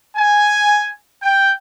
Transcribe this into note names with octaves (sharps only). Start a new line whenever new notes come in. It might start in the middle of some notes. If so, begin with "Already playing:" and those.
G#5
G5